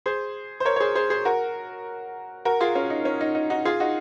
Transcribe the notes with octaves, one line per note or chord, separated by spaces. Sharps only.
G#4 C5
C5
A#4 C#5
C#5
G#4 C5
G#4 C5
G#4 C5
F#4 A#4
F#4 A#4
F4 G#4
C#4 F4
D#4
C#4
D#4
D#4
D#4 F#4
F4 G#4
D#4 F#4